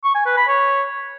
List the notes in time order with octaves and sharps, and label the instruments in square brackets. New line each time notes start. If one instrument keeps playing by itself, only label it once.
[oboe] C#6
G#5
B4
B5
C#5